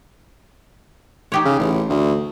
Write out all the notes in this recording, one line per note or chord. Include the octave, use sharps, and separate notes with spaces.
D#4 G4 C#5
C#3
A1
D2